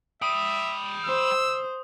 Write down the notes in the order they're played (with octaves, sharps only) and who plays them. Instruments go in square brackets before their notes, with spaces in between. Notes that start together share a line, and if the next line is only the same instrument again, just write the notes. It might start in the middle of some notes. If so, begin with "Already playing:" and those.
[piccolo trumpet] E5 [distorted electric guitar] G5 B5 [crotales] D#6
[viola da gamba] C5 [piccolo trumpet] E6